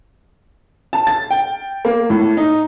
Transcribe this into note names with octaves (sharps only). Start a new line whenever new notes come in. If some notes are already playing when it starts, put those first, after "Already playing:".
A5
A6
G5
A#3
A2
D#4